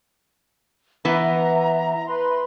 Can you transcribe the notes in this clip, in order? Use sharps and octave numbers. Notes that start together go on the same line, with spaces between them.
E3 B3 E5 A#5
B4 C6